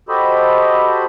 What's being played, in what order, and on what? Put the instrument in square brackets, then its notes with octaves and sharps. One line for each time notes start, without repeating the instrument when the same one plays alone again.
[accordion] F#4 G4 A4 C5 D#5 B5